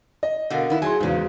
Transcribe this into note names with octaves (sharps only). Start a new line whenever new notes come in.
D#5
B2 D3 A#4 F5 F#5
D#3 B3 E4
F#3 G#4 G#5 C6
G#1 E2 G#2 C#3 F#4 B4 F5